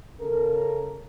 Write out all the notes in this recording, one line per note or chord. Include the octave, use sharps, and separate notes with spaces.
C#3 A4 A#4